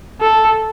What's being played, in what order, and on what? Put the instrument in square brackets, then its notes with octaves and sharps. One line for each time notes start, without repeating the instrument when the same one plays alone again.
[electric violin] A4